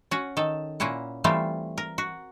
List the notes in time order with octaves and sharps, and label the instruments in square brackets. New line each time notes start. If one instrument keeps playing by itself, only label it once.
[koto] C#4 F#4
D#3 A4
A#2 A#3 C#4 E4 F#5
E3 G3 A3 C4 F4
A#4
F#4